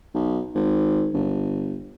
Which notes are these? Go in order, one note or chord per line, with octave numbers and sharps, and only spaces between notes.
B1
G#1
G1